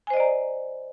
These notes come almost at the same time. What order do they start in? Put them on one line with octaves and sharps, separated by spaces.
G#5 C5 D#5 D5 A#5